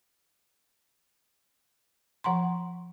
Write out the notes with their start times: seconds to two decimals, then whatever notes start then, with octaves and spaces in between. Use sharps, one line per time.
2.24 F3 F#5 A#5 C6